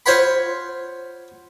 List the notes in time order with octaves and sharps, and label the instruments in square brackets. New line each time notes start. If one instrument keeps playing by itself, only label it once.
[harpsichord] F4 C5 C#5 F#5 B5